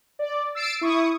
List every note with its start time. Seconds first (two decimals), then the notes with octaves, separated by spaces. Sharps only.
0.19 D5
0.55 E6 A6 C7 D7
0.81 E4 C#6 D#6